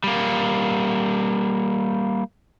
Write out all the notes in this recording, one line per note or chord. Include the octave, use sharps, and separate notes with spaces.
G3 A#3